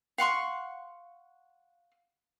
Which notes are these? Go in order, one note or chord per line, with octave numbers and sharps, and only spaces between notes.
F5 F#5 C6 C#6